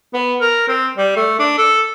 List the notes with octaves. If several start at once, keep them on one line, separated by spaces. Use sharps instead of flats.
B3
A#4
C4
G3
A3
D4
A4